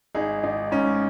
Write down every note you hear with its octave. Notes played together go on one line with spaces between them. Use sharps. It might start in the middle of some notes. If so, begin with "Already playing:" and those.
G#1 D#4 G#4
G#1 D#4
G#2 C#4